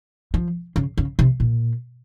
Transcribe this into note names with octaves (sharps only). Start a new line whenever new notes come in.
F3
C#3
C#3
C3
A#2